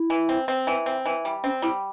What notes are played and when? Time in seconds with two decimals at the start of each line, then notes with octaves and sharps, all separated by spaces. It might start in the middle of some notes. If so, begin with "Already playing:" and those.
Already playing: E4
0.10 E3
0.29 C4
0.48 C4
0.67 E3
0.86 C4
1.06 E3
1.25 G3
1.44 C4 C#4
1.62 G3 E4